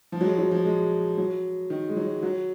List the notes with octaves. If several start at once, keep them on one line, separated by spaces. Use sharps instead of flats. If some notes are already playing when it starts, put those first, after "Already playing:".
F3
F#3
G#3
F#3
F3
G#3
F#3
D#3
G#3
F#3
F#3